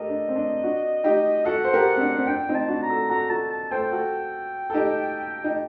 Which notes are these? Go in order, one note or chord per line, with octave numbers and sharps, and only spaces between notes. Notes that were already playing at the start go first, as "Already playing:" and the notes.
Already playing: G4 A4 A#4 D#5
D4
C4
D4
D4 F#4
D#4 G4
F#4 A4 F#5
C5
G4 A#4
C4
D4
C4
D4 G5
C4 D#4
A5
D4 F#4
A#5
F#4 A4
F#4 A4 A#5
F#4 A4 A5
A5
A4 C5 G5
F#4 A4
A4
D#4 G4
D#4